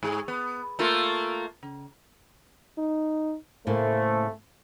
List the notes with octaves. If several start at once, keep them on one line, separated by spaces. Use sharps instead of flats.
G#2 G#4
B3
A3 A#3 F4
C#3
D#4
A2 C#3 A3 A#3 C5